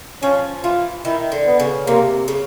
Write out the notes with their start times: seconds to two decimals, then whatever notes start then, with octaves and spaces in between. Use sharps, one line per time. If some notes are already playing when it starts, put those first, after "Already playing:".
0.22 F3 C#4
0.64 E3 F4
1.05 D#3 E4
1.32 D3
1.46 B3
1.60 C#3
1.87 C3 A#3
2.28 C#3